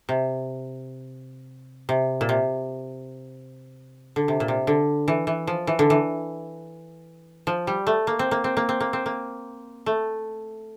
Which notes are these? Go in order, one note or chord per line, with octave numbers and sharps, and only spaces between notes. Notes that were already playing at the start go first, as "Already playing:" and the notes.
C3
C3
A#2
C3
D3
C3
A#2
C3
D3
E3
E3
F3
E3
D3
E3
F3
G3
A3
A#3
C4
A#3
C4
A#3
C4
A#3
C4
A#3
A3